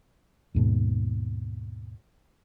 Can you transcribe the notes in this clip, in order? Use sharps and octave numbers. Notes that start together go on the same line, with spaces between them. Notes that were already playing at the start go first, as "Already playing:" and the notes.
D#2 G#2 B2